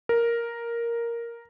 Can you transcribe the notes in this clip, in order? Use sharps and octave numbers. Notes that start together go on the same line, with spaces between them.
A#4